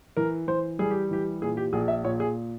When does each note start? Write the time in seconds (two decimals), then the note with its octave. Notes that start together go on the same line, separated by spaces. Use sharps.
0.17 E3 A#4
0.48 E3 C5
0.79 G3 G#4
0.91 G4
1.11 E3 G4
1.42 A#2 G#4
1.57 G4
1.73 A#1 G#4
1.88 E5
2.04 A#2 C#5
2.20 G#4